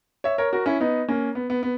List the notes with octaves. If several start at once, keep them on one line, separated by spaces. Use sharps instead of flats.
C#5 E5
A#4 C#5
F#4 A#4
C#4 E4
B3 D#4
A#3 C#4
B3
B3
B3